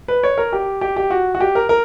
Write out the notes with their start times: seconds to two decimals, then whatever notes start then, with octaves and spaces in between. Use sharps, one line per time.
0.08 B4
0.23 C#5
0.38 A#4
0.53 G4
0.81 G4
0.96 G4
1.11 F#4
1.35 F#4
1.40 G4
1.55 A#4
1.69 A#4